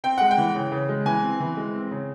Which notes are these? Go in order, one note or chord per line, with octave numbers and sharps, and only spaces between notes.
C4 G5
G#3 F#5
G5
E3
C#3
C#3
G#3
E3 G#5
C4
E3
G#3
C4
C#3